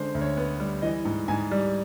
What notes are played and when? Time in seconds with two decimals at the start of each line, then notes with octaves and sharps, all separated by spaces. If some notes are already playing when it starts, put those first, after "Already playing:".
Already playing: D3 G#3 C#4 C5
0.15 D2
0.21 C#5
0.37 B3
0.60 G3
0.82 E3 D#5
1.05 G#2
1.28 G#2 G#5
1.51 G3